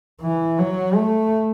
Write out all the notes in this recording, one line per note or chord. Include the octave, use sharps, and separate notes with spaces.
E3
F#3
A3